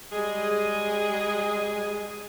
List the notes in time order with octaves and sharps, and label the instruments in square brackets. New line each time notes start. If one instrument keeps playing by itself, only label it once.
[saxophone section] G3 G#3 G#4